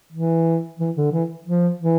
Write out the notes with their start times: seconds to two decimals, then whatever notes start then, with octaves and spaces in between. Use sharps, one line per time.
0.12 E3
0.79 E3
0.96 D3
1.12 E3
1.45 F3
1.79 E3